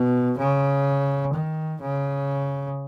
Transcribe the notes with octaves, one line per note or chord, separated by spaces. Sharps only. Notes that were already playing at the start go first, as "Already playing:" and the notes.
Already playing: B2
C#3
D#3
C#3